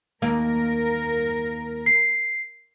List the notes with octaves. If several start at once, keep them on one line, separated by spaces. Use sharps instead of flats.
D#2 A#3 A#4
C7